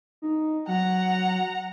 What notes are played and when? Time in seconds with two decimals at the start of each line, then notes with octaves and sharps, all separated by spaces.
0.22 D#4
0.67 F#3 F#5 A#5